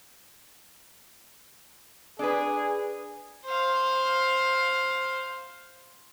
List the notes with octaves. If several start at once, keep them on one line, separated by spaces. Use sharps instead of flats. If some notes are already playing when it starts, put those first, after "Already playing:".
D4 G#4 B4
C5 F5